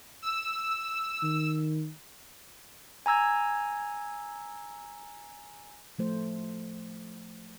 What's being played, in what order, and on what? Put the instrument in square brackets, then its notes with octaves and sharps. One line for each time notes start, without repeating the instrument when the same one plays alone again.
[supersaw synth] E6
[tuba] D#3
[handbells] G#5 A#5 E6 G#6
[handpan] F3 A3 C5